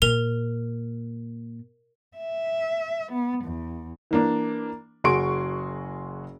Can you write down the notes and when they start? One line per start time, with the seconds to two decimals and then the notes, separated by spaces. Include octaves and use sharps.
0.02 A#2 A#4 F7
2.17 E5
3.12 B3
3.45 E2
4.11 E3 A#3 D4
5.04 F#1 F#4 G#4 C6 C#6 D7